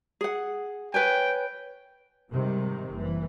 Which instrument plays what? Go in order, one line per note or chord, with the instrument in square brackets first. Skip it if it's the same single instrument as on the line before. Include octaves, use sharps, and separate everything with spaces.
[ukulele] G#4 F#5
[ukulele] B4 C#5 G#5 [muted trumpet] G5
[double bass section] G#2 C3 D#3 G3
F#1 E3